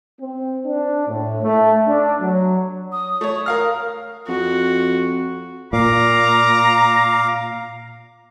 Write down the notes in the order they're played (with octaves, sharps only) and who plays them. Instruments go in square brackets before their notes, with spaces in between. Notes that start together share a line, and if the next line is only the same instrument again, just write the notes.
[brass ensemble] C4
D4
A2
A3
D4
F#3
[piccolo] D#6
[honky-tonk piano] A3 C#5
A#4 F5 F6
[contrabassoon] F2 [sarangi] F#4
[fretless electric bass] A#2 [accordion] F5 D6 [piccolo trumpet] A#5